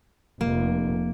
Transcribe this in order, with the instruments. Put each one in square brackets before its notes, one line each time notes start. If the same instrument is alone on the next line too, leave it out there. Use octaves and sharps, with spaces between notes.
[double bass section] F1 [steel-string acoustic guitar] A#3